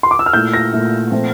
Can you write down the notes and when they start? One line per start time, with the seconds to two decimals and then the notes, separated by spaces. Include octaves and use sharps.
0.03 C6
0.11 D6
0.19 E6
0.26 F6
0.33 A#2 A3 E4 G6
0.54 A#6
0.73 A#2 A3 E4
1.11 A#2 F3 A3 C4